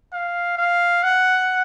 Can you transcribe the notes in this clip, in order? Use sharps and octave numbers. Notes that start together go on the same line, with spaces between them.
F5
F5
F#5